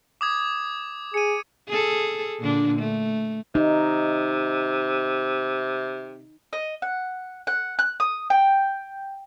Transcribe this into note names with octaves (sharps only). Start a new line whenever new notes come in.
D6 D#6 G#6
G#4 C#7 D#7
G#4 A4
A#2 D3 D4
A3
C3 D#4
D#5
F#5
F#5
F#6
D#6
G5